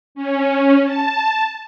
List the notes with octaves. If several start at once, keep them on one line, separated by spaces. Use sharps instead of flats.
C#4
A5